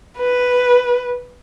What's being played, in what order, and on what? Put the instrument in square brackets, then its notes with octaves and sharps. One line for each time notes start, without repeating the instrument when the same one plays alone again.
[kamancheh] B4